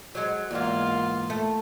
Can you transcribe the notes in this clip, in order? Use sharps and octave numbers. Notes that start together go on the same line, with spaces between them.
F#3 G#3
E2 G#2 A#3 F4
A3